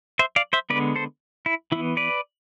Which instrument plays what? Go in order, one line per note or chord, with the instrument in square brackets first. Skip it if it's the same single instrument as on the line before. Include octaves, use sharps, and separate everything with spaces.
[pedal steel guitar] C5 E5
D5 F5
C5 E5
D3 G#3 B3 B4 D5
A4 C5
E4
E3 E4
B3
B4 D5